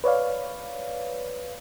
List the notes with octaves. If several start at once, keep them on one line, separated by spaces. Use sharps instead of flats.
B4 C#5 D5 F5